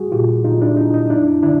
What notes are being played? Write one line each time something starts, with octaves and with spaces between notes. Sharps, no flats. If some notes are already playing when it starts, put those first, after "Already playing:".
Already playing: G3 F#4 G#4
A#2 F4 G4
A#2 D#4 F4
D4 E4
A#2 D#4
D#4
F#2 D4 E4
D3 D4 E4